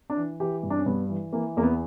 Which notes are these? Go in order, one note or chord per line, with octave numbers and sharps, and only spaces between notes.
D4
E3
E3 G4
G2
D4
C#4
G2 B3
E3
E3 A#3
E2 A#3
B3